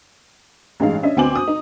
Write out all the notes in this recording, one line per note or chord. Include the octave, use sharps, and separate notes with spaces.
A1 G2 G#3 D#4 F5
C#4 D4 D#5 E5
D2 B3 C4 G#5 D6 F#7
D#6
D#4